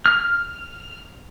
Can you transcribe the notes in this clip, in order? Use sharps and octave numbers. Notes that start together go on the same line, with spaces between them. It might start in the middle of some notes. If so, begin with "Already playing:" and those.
F6